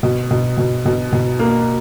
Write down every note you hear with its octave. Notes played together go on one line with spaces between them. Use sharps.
B2
B2
B2
B2
B2
A#3